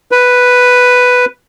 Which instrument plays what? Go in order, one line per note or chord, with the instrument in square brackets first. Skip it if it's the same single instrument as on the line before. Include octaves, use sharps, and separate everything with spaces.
[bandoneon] B4